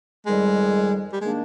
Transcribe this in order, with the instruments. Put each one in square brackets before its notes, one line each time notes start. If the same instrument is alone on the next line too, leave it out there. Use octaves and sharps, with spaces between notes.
[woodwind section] F2 D#3 G3 [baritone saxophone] G#3
[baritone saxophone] G3
[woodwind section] D#3 A#3 D4 [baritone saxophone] G#3